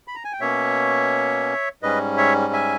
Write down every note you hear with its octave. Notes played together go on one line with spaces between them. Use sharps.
B5
A#5
G#5
G5
B2 A#3 C#4 C#5 E5
G#2 G3 C#4 B4 D#5
C#5 E5
E5 G#5